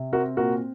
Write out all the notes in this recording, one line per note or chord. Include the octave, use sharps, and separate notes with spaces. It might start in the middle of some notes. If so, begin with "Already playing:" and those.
Already playing: C3
C4 F#4 A#4
A#2 F#4 A#4